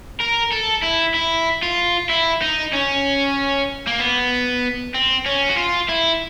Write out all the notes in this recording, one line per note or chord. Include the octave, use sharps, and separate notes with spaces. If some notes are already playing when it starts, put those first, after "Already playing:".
A#4
A4
E4
E4
F4
E4
D#4
C#4
A#3
B3
C4
C#4
F#4
F4
E4